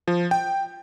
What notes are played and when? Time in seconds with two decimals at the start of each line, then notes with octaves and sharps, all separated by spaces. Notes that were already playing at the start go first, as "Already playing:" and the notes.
0.08 F3
0.31 G5